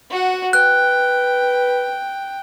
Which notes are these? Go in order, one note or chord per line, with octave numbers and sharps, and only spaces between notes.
F#4 F#5
B4 G5 F#6